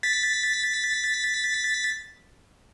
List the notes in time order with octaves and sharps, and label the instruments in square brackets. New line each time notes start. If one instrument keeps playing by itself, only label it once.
[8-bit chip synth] A6 B6